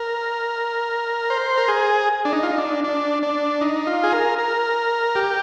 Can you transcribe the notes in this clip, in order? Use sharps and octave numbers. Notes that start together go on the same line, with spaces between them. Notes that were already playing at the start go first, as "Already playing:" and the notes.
Already playing: A#4
C5
A#4
G#4
D4
D#4
F4
D#4
D4
D4
D4
D#4
F4
G#4
A#4
A#4
G4